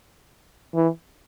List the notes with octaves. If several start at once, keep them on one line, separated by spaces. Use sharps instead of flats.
E3